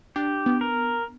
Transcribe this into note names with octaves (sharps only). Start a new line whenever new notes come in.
D4 G4
B3
A#4